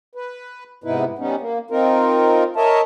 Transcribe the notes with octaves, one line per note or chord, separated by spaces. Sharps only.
B4
G#2 C3 B3 D#4 E4 B4
G3 B3 C#4 D#4
A#3
C4 D#4 F4 A#4
A#4 C#5 D#5 E5 A5